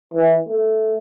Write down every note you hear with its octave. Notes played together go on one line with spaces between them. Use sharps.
E3
A3